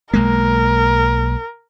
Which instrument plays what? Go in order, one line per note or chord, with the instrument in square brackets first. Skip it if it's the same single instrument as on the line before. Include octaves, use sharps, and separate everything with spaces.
[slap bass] B1 G#3 A#3 [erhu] A#4